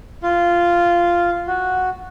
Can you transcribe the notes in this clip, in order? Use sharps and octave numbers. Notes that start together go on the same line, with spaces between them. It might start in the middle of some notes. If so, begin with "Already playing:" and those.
F4
F#4